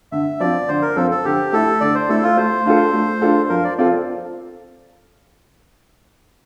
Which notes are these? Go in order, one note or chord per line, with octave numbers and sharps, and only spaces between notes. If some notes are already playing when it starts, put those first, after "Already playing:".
D3 E5
F3 C4 D5
D3 C5
A#4
F3 C4 A4
A4
D3 G4
A3 E4 A4
D3 D5
C5
A3 E4 A4
F4
A3 C5
D4 F4 A4
A3
D4 F4 A4
F3 A#4
D5
C4 F4 A4 D5